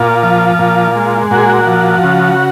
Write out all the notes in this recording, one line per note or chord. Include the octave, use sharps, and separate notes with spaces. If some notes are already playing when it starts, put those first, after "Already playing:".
Already playing: A#2 F4
F3
A#2
G#3
A#2 F#4
G#4
F#4
F3
C#3